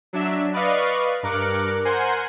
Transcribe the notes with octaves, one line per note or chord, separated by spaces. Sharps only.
F#3 D4 E5 E7
B4 D5 D#5 F5 C#6
G2 A#4 D6 F#6 C#7
A#4 C5 F#5 G#5 C6